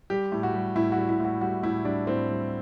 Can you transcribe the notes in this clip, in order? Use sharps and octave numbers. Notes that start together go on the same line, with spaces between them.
G3 G4
A2
F#4
G3
A2 E4
F#4
G3
E4
A2 F#4
G3 F#4
A2 E4
G3 D4
A2 C4
G3